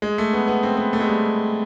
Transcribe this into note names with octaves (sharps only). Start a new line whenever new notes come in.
G#3
A3
B3
B3
C4
B3
A3
G#3
G3